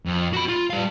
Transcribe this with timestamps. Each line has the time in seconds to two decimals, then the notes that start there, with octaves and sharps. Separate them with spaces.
0.06 F2
0.33 F#4 B5
0.49 F4
0.70 G3 F5